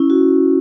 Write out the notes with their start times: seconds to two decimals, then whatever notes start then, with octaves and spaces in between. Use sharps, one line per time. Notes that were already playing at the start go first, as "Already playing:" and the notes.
Already playing: C#4 E4
0.10 F#4